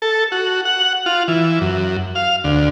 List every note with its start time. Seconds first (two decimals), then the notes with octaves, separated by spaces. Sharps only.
0.02 A4
0.32 F#4
0.65 F#5
1.06 F4
1.28 E3
1.61 F#2
2.15 F5
2.44 D2